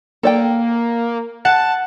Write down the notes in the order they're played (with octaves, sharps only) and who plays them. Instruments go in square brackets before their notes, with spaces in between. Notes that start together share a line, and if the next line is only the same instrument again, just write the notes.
[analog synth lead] A#3 [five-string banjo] A4 D5 G5
[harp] F#5 [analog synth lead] A5